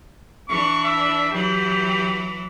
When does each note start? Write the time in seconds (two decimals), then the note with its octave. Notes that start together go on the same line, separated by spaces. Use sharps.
0.49 E3 D4 C#6
0.84 E5
1.32 E3 F#3 G4